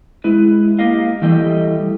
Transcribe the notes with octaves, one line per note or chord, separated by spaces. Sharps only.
G#3 E4 B4
A#3 G4 A#4 D#5 F5
E3 G3 A3 G4 D#5